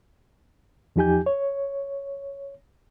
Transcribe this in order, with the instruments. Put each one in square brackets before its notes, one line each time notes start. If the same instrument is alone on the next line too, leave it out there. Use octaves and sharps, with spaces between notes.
[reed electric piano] E2 F3 D#4 G4 G#5 G6
C#5